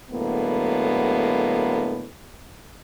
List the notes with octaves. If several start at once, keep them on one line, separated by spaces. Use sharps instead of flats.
A2 D3 F#3 G#3 A#3 B3